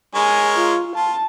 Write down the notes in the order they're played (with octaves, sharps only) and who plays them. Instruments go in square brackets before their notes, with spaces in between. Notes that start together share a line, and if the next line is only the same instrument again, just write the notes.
[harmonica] G#3 A#4 C#5 [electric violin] G#5
[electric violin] F4
[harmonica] F4 [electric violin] A5